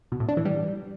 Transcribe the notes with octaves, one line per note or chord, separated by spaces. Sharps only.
B2
A2
D4
E3
G3